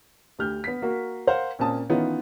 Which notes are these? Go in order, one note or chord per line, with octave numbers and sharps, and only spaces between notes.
D2 G4 F6 G6
B3 B6
A#3 F#4 A#4
A#4 C5 F5 F#5
A#2 A#3 C4 C#4 A5 D#6
D#3 E3 B3 C#4 D#4 F4